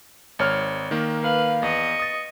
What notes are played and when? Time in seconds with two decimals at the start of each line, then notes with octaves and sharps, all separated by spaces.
0.39 G#1 C#5 F6
0.91 D#3 A#3
1.22 B4 F5
1.63 E2 D#5 C#6
1.99 D#6 A6